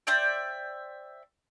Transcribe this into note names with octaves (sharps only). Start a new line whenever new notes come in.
C5 D5 E5 G5